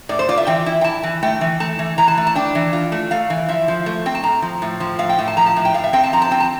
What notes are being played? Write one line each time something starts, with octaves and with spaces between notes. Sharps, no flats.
A2 D5
C5
F4 D5
E5
E3 G5
E4
G5
E4 A5
E3
A3 G5
E3
A3 A5
E3
E3 A#5
A5
A3
A5
D4 G5
E3
F4
A3
A3 F5
E3
F3 E5
F3
A3
C4 G5
A5
A2 A#5
F3
A2
F3
A2 F5
G5
A2
A5
F3 A#5
A5
A2
G5
A2 F5
E5
C4 G5
A5
F3 A#5
A5
C4 G5
A5